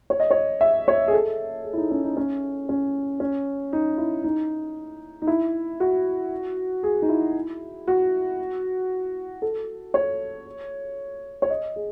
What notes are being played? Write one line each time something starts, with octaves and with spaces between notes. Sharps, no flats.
C#5
D#5
C#5
E5
C#5
G#4
A4
G#4
E4
D#4
C#4
D#4
C#4
C#4
C#4
D#4
E4
D#4
D#4
E4
F#4
G#4
D#4
E4
F#4
A4
C#5
C#5
D#5
G#4